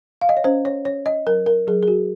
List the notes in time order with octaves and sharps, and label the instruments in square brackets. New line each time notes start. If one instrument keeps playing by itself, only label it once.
[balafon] F5
D#5
C#5
C#4 C5
C#5
C#4 C#5
D#5
F#3 A#4
A#4
F#3 G#4
G#4
F#4